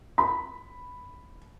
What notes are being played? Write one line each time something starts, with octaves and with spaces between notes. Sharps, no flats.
B5